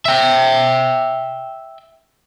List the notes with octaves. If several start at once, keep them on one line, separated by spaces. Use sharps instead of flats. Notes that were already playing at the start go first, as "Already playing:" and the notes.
E5 G5